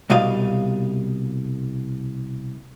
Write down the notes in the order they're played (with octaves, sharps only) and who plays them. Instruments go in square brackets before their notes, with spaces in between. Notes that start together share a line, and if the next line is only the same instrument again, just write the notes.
[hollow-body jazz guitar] C2 B2 G3 D#5 F5